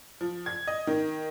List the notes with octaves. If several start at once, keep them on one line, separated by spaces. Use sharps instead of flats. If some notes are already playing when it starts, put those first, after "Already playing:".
F3
G#6
D#5
D#3